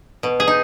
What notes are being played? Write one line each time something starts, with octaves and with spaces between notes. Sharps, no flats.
B2
G#4
D#4